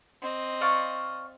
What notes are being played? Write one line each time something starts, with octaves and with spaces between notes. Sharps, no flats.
C4 D#5
D5 F5 C#6